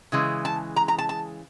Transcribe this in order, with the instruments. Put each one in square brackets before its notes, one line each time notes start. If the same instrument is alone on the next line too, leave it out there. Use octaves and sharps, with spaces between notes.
[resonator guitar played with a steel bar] C#3 E3 G#3
A5
A#5
A#5
A5
A5